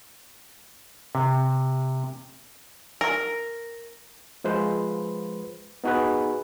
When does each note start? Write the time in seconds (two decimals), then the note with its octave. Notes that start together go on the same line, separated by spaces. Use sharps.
1.15 C3
3.01 A#4
4.44 F3 G#3 B4 C5
5.84 B3 D#4 F#4 G#4 B4